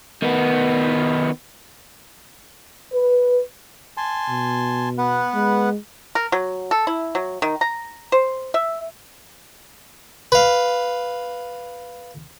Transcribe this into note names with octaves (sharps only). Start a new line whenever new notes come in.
D#3 B3
B4
G#5 A5 C6
B2
B3 B4 F#5
G#3
A#4
F#3
A4
E4
F#3
D#3
A#5
C5
E5
B4 F5